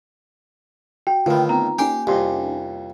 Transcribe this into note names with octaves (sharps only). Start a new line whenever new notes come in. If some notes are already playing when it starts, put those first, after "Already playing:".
F#4 G5
A2 D3 D#3 F4 B4
B3 C4 D#4 A#5
A#3 C#4 D#4 G4 G5 G#5 C6
C2 F2 G4 D#5 C6